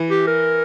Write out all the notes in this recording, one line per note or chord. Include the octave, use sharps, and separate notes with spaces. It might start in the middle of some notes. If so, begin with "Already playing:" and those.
Already playing: E3
G4
A#4